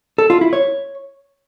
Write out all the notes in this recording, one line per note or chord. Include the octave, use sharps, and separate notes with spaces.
A4
F4
E4
C#5